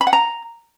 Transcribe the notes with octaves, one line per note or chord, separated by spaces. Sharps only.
B5
F#5
A#5